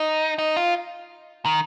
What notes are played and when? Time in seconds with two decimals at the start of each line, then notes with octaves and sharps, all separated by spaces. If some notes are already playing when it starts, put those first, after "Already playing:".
Already playing: D#4
0.38 D#4
0.56 F4
1.46 D#3